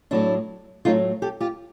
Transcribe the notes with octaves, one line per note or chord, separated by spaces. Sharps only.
A2 F#3 A3 D4 E4
A2 F#3 A3 D#4 F4
G4 A4
F4 G4